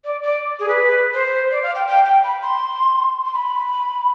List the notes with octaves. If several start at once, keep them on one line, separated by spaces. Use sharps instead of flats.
D5
D5
G#4
B4
C5
D5
F5
G5
G5
G5
B5
C6
C6
B5